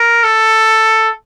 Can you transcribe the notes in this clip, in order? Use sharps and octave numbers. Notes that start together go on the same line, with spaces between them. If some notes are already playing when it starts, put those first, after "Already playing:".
Already playing: A#4
A4